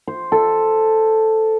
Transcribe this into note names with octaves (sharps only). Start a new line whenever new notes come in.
C5
A4